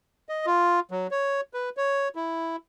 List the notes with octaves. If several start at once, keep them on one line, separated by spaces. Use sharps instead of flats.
D#5
F4
F#3
C#5
B4
C#5
E4